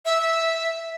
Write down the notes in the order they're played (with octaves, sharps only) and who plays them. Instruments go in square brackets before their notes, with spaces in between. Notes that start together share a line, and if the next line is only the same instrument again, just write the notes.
[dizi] E5